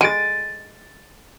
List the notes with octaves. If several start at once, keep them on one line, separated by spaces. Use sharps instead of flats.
G#3 A6 D7 D#7